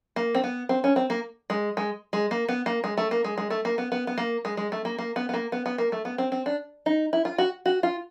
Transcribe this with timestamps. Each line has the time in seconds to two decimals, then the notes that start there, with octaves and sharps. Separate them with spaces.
0.16 A#3
0.35 C4
0.44 B3
0.69 C4
0.84 C#4
0.96 C4
1.10 A#3
1.50 G#3
1.77 G#3
2.13 G#3
2.31 A#3
2.49 B3
2.66 A#3
2.84 G#3
2.97 A3
3.11 A#3
3.24 G#3
3.38 G#3
3.50 A3
3.65 A#3
3.78 B3
3.92 B3
4.07 B3
4.18 A#3
4.45 G#3
4.57 G#3
4.72 A3
4.85 A#3
4.98 A#3
5.16 B3
5.29 B3
5.34 A#3
5.52 B3
5.66 B3
5.78 A#3
5.92 A3
6.05 B3
6.18 C4
6.32 C4
6.46 D4
6.86 D#4
7.13 E4
7.25 F4
7.38 F#4
7.66 F#4
7.83 F4